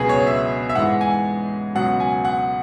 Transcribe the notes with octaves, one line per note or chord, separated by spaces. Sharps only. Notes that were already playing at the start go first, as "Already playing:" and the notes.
Already playing: C#2 B2 F#3 G#4 B4
C#5
E5
E5
G#2 E3 G#3 F#5
G#5
C#2 B2 F#3 F#5
G#5
F#5